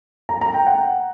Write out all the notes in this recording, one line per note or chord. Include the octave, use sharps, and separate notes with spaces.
A#5
A#5
G5
F#5